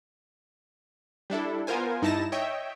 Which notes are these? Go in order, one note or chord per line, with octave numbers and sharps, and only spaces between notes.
G3 D4 E4 A4
B3 F4 A#4 C5 G#5
G2 D#4 E4 A5 A#6 E7
C#5 D#5 E5 G5